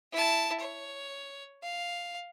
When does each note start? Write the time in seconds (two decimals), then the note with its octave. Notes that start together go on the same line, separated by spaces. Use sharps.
0.12 E4 A5
0.60 C#5
1.63 F5